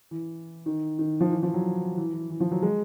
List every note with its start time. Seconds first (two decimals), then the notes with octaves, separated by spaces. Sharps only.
0.11 E3
0.66 D#3
0.99 D#3
1.21 F3
1.31 E3
1.43 F3
1.54 F#3
1.97 E3
2.14 E3
2.30 E3
2.40 F3
2.51 F#3
2.62 G#3